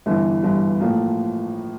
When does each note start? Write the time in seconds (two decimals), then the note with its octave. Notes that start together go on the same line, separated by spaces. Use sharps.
0.06 G1 G2 E3
0.43 G1 G2 E3
0.81 A2 F3 A#3